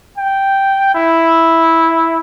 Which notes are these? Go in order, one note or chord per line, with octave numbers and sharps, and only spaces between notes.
G5
E4